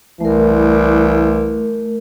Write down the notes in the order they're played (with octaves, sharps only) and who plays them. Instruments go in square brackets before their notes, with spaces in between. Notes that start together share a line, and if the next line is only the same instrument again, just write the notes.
[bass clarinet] C2 [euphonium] E3 [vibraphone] A3 A#4